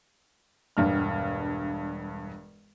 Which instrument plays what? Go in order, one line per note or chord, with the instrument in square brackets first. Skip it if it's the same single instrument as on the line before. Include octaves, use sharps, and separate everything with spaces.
[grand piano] E1 G2 F6